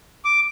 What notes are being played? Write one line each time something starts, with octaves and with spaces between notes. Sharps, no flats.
D6